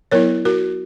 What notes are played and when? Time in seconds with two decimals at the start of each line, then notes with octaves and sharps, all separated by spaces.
0.11 F#3 B3 E4 A#4 C#5
0.45 F#4 A#4